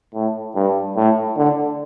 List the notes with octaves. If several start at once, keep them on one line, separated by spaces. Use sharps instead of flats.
A2
G2
A2
D3